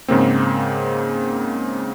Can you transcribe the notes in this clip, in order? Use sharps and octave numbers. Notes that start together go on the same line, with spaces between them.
G#2 C#3 A#3 C4